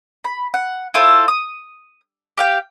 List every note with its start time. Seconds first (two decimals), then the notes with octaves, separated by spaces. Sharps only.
0.24 B5
0.54 F#5
0.94 E4 F4 A4 C5
1.28 D#6
2.37 G4 F5 G5